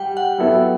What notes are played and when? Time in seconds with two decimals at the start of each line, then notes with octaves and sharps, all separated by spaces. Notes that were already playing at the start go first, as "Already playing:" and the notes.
Already playing: G3 G4 F#5 G5
0.17 F#5
0.38 F#3 B3 E4 A4